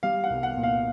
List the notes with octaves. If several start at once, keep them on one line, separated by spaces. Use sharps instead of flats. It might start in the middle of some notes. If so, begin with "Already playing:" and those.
G3 F5
F#5
C2
F#5
A#2
F5